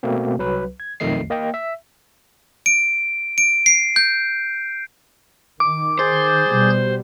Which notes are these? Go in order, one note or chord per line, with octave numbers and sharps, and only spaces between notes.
B2 A3 A#3 C4
C2 F#3 B4
G#6
B1 F2 D#3 A3 D#5 C7
A#3 D#5 G5
E5
D7
D7
C7
G6
D#3 D6
G#4 C5 G6 A6
B2 G3